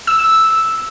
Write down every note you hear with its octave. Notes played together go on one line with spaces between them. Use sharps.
E6